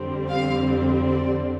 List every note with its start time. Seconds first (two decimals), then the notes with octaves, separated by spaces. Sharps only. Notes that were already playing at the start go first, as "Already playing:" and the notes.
Already playing: F2 D3 G3 C4
0.31 F5
1.08 D5